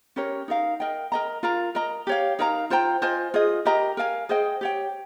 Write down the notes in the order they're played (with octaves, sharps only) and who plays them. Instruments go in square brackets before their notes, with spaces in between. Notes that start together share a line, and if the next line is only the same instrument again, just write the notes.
[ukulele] C#4 G4 A#4 C#5
D#4 A#4 F5
A#4 D#5 G5
A#4 D#5 A#5
F4 A#4 F5 A#5
A#4 D#5 A#5
G4 C#5 F5
D#4 A#4 F5 A#5
F4 C5 G5 A#5
F4 C5 D#5 G#5
F4 G#4 D#5
G4 A#4 D#5 A#5
A#4 F5 G#5
G#4 C5 D#5 G5
G4 C#5 G5